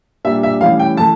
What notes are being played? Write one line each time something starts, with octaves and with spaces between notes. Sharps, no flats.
A#2 G3 D4 E5
E5
A2 E3 G3 C#4 F5
G5
E3 A3 A5